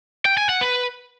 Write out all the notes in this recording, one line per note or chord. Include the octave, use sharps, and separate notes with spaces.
G5
G#5
F#5
B4